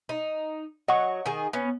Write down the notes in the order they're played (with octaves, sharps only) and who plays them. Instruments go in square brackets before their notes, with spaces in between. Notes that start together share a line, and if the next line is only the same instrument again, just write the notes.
[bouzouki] D#4
[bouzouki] F#3 [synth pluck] D#5 F#5 C#6
[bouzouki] D#3 G#4
B3 C#4